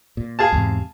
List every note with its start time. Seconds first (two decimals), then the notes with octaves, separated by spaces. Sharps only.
0.17 A#2
0.39 G#4 F5 A5
0.53 E2 G#2 C3